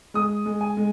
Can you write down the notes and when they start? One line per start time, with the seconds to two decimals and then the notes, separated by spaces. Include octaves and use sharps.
0.14 G#3 D#6
0.46 G#3
0.61 G#5
0.77 G#3